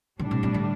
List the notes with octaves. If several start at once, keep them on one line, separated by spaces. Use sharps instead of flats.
A2 D3 G3 D4
C3
C3
D3